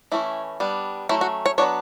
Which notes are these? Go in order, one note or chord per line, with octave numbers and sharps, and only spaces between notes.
E3 A3 C#4 E4
G3 B3 D4
F#3 A3 C#4 E4
F#4
C#5
F#3 B3 D4 C#5